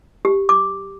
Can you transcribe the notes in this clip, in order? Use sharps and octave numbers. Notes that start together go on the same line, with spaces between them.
G4
D6